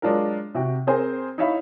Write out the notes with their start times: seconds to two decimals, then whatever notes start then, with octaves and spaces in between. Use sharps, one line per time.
0.02 F#3 G#3 D4 F4 A#4
0.55 C3 F#4 G5
0.87 C4 G#4 A#4 C5 G#5
1.38 D#4 E4 C#5 E5 F5 B5